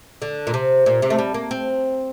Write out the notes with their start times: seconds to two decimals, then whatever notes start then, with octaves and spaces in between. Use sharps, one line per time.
0.22 D3
0.47 A#2
0.54 C3
0.86 A#2
1.02 C3
1.10 A3
1.19 G3
1.34 A#3
1.51 C4